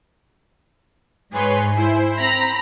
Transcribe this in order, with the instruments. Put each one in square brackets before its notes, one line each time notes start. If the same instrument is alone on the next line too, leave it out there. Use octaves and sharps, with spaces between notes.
[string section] G#2 [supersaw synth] B4 C#5 C6 [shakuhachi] G#5
[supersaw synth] E4 C5
[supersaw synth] C4 [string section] A#5 B5